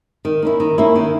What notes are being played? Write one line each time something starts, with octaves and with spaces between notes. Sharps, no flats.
D#3
A#3 C#4 E4
D#3
A#3 C#4 E4
D#3